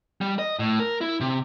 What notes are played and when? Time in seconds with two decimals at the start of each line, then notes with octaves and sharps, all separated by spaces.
0.21 G3
0.39 D#5
0.59 A2
0.80 A#4
1.01 E4
1.21 C3